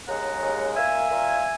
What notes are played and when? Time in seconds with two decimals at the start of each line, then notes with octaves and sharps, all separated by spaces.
0.07 D#2 C#3 G#3 F#5 A#5
0.41 D#2 C#3 G#3
0.75 A#2 A#3 E5 G#5
1.10 A#2 A#3